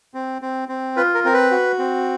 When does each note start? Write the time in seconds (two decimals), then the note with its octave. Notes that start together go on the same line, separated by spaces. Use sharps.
0.14 C4
0.42 C4
0.68 C4
0.96 F4 B4
1.14 A#4
1.25 C4 A#4
1.34 B4
1.51 F#4
1.79 C4